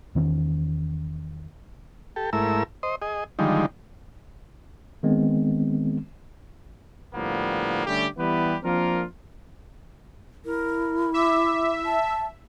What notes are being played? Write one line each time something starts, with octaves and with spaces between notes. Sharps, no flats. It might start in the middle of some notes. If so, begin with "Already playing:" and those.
E2 D#3 C#4
G4 A4
G#2 A3 E4 A#4 E6
C5 D#5
G#4 D#5
D3 D#3 F3 G3 G#3 D#4
D#3 G#3 B3 C4
A2 D3 F3 G3 A#3 B3
D3 G3 A3 C#4 G4
E3 G3 B3 E4 G4 B4
F3 A#3 C4 D4 F4 A#4
E4 A#4
E5 D6
A5